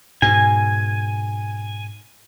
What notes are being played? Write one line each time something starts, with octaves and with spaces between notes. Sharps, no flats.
G#2 B2 G#5